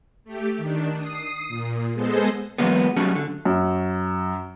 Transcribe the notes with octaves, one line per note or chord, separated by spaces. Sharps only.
A3 G4
D#3 D4
D#6 C7
A#2
G#3 B3 G#4 A4 C5 D#5
E3 F#3 G#3 A#3 B3
F#3 G3 A3 C#4 G#4
D3
F#2